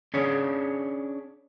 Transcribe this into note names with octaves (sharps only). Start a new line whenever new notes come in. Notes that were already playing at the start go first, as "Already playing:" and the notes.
C#4 D4 G#4 C#5